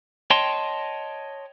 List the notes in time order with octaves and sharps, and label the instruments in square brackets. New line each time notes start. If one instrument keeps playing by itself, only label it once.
[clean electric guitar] C#5 D#5 G5 A5 C6